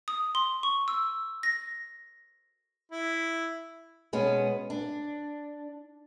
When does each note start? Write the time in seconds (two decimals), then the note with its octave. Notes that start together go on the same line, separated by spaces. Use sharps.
0.08 D#6
0.35 C6
0.63 C#6
0.88 E6
1.43 A#6
2.91 E4
4.13 B2 G#3 B3 C#4
4.70 D4